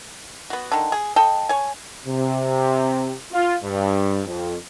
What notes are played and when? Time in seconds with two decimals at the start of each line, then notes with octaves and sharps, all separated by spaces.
0.50 B3 F#4
0.72 D3 D#3
0.92 G#4
1.16 A4 D#5 G5
1.49 C#5 G#5
2.07 C3
3.33 F4
3.64 G2
4.26 F2